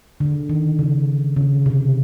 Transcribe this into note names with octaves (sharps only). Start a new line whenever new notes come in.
D3
D#3
C#3
C#3
C3